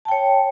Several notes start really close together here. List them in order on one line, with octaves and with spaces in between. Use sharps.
A5 G5 C#5